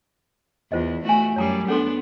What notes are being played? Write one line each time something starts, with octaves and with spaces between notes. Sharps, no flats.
E2 F4 C5 D#5
A3 E4 F#4 G#5
F#2 G3 C#5 A#5 D6
B3 C#4 D4 A4 C6